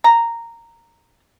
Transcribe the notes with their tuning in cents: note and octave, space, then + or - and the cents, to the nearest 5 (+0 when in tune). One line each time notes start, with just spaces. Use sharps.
A#5 -10